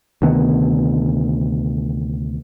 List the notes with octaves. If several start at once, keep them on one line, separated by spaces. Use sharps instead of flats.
D2 C3 D#3 B3